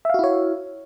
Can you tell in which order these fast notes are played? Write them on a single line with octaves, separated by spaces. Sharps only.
E5 F5 F#4 E4 C#5